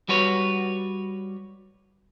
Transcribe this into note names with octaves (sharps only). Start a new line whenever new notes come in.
G3 F#4 B4 C#5